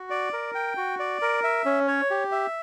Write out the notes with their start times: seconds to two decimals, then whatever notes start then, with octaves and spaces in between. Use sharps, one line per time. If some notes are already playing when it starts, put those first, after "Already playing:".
Already playing: F#4
0.10 D5
0.33 A#4
0.55 G5
0.77 F#4
0.99 D5
1.22 A#4
1.44 E5
1.65 C#4
1.88 C#5
2.11 G4
2.32 E5